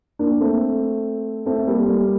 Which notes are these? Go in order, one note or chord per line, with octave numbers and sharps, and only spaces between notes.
A#3 D4
A3 C4
A3 C4
G3 A#3
G3 A#3